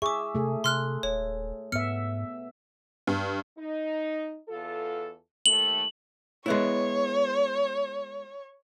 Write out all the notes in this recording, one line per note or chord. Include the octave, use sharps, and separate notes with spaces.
G#4 E5 C#6 D6
C3 A3 G#4
C3 C6 F6 F#6
D#1 C#5
G#2 B3 E5 F6 C#7
G2
D#4
E2 F4 A4
D#2 D#3 A3 F#7
G#3 B3 E4 C#5